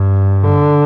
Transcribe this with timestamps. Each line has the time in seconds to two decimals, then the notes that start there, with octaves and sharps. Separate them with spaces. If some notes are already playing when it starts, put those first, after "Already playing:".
Already playing: G2
0.44 D3